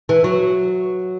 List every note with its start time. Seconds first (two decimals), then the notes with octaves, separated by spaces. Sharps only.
0.09 E3
0.24 F#3